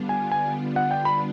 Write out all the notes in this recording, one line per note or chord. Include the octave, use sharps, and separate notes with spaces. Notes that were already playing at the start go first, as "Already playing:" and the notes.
Already playing: D3 G3 B3 D4 F4
G#5
G#5
F#5
G5
B5